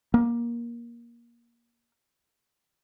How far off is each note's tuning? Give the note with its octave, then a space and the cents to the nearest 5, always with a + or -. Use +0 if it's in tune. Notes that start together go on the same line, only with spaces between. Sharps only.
A#3 +20